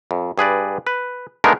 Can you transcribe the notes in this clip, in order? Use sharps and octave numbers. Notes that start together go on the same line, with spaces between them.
F2
G2 G#4 B4 D5
B4
G#3 A3 B3 D4 D#4 A#4